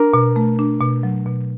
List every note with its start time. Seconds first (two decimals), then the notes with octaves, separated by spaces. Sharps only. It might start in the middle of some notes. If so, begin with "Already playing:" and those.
Already playing: D4 A#4
0.14 B2
0.36 A3
0.59 D4
0.81 B2
1.03 F#3
1.26 B2